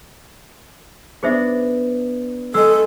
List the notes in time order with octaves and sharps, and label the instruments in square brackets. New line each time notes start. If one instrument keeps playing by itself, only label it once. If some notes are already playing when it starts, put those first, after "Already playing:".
[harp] B3 D4 [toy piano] G#4 C5 E5
[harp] G#3 D#5 [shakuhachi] A4 [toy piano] E6